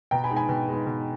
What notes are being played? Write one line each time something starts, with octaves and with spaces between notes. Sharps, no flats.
B2 G5 A#5
G#5 B5
G#3 D#4
G#5 B5
B2
G#3 D#4
B2